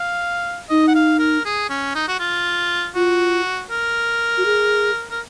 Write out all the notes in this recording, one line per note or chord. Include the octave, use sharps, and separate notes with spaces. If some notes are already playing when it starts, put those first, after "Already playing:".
Already playing: F5
D#4 D#5
F#5
F5
A#4
G#4
C#4
D#4
F#4
F4
F4 F#4
A#4
F#4
G#4
A#4